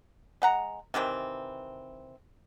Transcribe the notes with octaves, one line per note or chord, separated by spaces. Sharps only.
G#3 F#5 A#5
C3 D#3 E3 C4